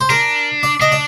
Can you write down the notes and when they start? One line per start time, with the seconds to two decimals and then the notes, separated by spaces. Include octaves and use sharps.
0.01 C5
0.10 D4 A#4
0.63 D5
0.80 D4 D#5
0.92 D5